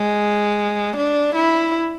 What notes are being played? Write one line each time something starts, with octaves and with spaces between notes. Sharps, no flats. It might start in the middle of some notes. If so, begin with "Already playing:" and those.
Already playing: G#3
D4
E4